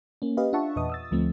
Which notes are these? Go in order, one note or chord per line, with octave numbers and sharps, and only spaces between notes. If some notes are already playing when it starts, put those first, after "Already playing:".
A#3 C#4
G4 B4 D#5 F5
D4 F4 E5 F#5 A5 C#6
E2 A#2 B4 D#5 D#6
D#6 E6 A6
D2 F3 A3 C4